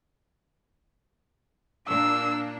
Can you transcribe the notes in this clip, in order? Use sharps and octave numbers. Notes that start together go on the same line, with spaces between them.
A#2 A#3 D4 E6